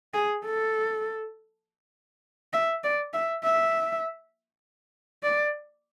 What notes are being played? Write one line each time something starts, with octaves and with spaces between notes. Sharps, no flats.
G#4
A4
E5
D5
E5
E5
D5